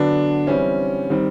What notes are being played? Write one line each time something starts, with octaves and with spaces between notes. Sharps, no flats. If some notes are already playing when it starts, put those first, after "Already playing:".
Already playing: D3 F#3 B3 D4
E3 G3 C4 C#4
D#3 G3 C4